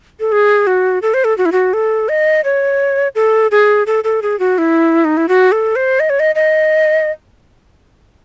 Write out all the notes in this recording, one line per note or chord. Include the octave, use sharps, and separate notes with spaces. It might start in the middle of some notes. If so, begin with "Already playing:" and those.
A4
G#4
F#4
A4
C5
A4
F#4
E4
F#4
A4
D#5
C#5
A4
G#4
A4
A4
G#4
F#4
E4
D#4
E4
F#4
A4
C5
D#5
C#5
D#5
D#5